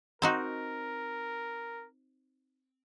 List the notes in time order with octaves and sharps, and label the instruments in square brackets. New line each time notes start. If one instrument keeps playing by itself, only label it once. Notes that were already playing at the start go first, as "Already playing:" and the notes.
[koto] C4 D#4 F#4 [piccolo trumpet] A#4